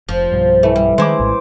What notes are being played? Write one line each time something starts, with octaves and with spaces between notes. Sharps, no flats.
F1 F3
B1 G2
E3 A3
G3
D#3 G#3 E4 C5 D6
A#1 A2